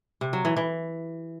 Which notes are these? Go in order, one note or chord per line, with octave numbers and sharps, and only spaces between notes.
C3
F#3
E3
E3